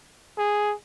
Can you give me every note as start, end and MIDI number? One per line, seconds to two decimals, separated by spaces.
0.38 0.74 68